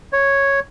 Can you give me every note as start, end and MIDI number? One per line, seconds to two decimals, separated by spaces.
0.13 0.60 73